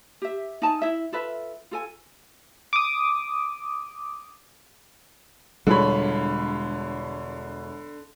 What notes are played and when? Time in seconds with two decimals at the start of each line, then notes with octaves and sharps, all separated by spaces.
0.22 G4 E5
0.62 D#4 G#5 A5
0.82 E4 E5
1.12 F4 A4 B4 E5
1.71 F4 A4 G#5
2.73 D6 D#6
5.67 E1 D3 G3 G#3 F4 C#5 B5